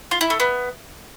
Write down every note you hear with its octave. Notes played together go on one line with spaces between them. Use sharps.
F4
E4
A3
B3